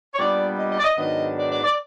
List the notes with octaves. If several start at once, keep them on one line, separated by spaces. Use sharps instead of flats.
C#5
A#2 G3 B3 D4 D5
D#5
D#5
D5
D#5
G#2 D#3 F#3 B3 D4 D#5
D5
D5
D5